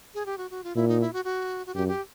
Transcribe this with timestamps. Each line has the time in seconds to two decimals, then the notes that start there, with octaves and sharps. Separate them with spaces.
0.14 G#4
0.26 G4
0.38 F#4
0.51 F#4
0.64 F4
0.75 A#2 E4
0.88 D#4
1.01 E4
1.13 F#4
1.25 F#4
1.67 F#4
1.75 F#2 G4
1.88 G4